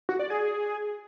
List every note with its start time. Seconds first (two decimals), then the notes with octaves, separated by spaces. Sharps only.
0.09 F#4
0.19 D5
0.30 G#4